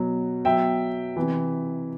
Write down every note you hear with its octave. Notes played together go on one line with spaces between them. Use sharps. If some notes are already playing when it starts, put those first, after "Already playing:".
Already playing: B2 F#3
B2 F#3 E5 G5
C3 E3